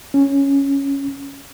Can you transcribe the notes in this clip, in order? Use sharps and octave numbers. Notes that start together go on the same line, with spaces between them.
C#4